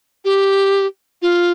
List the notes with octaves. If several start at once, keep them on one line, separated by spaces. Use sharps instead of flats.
G4
F4